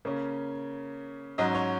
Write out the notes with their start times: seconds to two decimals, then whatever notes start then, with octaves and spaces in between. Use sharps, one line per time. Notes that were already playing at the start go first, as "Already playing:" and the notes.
0.05 C#3 A#3 C#4
1.38 G#2 F#3 C#4 D#5
1.55 C#5